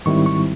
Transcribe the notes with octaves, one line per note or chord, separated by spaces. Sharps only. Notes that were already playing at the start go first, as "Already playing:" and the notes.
G#2 D#3 G3 C4 E4 C#6
C#6